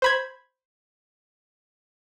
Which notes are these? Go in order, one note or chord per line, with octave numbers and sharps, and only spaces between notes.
C5 B5 G#6